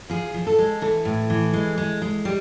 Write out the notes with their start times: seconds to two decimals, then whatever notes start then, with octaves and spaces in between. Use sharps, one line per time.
0.10 F3 G#4
0.34 F3
0.47 A4
0.59 G#3
0.82 E3 A4
1.05 A2
1.30 E3
1.53 G#3
1.78 G#3
2.02 G#3
2.25 G3